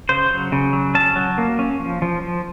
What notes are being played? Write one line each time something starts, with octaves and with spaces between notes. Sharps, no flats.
C#3 C5
F#3
C#3
F#3
C#4 A5
F#3
A#3
C#4
F3
F3
F3